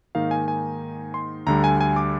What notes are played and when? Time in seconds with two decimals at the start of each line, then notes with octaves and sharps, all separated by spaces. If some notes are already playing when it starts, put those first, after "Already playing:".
0.15 G#2 D#3 A#3 D#4 F5
0.31 G#5
0.48 G#5
1.14 C6
1.47 D2 D3 G3 A#5
1.64 G#5
1.81 G#5
1.96 D6